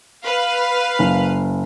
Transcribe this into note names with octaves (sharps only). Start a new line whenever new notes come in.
B4 F5
F#1